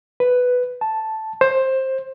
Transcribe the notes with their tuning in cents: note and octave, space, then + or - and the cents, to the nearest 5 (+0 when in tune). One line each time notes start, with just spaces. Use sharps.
B4 +5
A5 -5
C5 +15